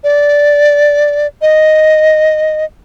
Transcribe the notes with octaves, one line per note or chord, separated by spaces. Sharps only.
D5
D#5